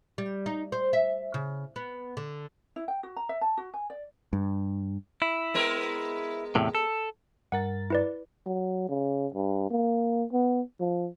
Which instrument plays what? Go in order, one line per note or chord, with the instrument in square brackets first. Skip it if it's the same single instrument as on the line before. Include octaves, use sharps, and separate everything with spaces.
[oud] G3
D#4
C5
E5
C#3
B3
D3
[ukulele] E4
G5
F#4
A#5
E5
A5
F#4
G#5
D5
[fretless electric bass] G2
[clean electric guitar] E4
[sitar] G#3 B3 A#4
[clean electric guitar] E2 A2 C3
A4
[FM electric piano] G2 A#4 A6 [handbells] F#5
[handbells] E4 B4 D5
[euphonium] F#3
C#3
G2
A#3
B3
F3